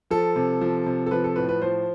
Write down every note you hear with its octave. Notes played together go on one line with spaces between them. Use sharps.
F3 A4
C3
F3
C3
A4
F3 B4
A4
A2 B4
B4
F3 C5